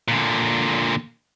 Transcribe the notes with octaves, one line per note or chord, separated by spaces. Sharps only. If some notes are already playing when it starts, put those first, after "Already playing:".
A#2 D3